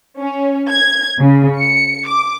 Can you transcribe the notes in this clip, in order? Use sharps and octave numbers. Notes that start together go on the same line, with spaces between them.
C#4
G#6
C#3
C#7
D6